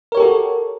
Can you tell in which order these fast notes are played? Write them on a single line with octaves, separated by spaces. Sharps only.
A#4 C#5 G4 A4 F#4